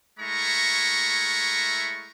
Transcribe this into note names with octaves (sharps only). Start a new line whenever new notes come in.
G#3 A3 E4 A#5 C#6